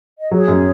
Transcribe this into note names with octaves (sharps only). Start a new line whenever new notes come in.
D#5
F#3 G#4 C#5
F#2